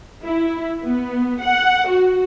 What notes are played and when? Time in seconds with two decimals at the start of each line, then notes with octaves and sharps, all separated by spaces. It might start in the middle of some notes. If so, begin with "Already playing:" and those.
0.23 E4
0.84 B3
1.41 F#5
1.88 F#4